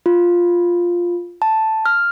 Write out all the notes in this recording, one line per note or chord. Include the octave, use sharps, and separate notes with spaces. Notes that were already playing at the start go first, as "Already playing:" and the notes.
F4
A5
F6